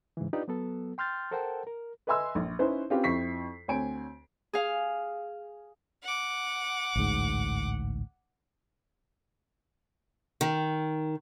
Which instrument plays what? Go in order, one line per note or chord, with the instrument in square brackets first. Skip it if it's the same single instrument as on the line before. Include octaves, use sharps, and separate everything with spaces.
[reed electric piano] G#2 C#3 E3
D4 D#4 F4 G4 B4 D5
F#3 B3 A4
G5 C6 F6 G6 A6
A4 A#4 C5 F#5 G5 A5
A#4
[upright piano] B4 D#5 E5 G#5 C6 E6
A#1
C#4 D#4 E4 B4 C5
C4 C#4 F4 G4 B4
F2 C4 E4 C#6 B6 C7
D2 C4 C#5 G#5 D7
[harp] G#4 F5
[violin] F#5 D6
[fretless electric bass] A1 D2 G#2
[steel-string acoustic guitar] D#3